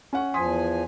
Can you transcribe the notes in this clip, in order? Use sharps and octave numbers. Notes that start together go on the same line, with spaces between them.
C#4 F#5 C#6
E2 F3 G#5 C6 D#6 B6